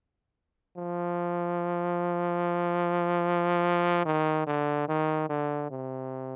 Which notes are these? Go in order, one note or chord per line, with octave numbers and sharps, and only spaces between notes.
F3
D#3
D3
D#3
D3
C3